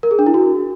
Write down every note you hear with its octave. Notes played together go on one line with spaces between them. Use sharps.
A#4
G#4
D4
E4
F#4